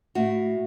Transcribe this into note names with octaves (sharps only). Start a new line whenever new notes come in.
A2 F#4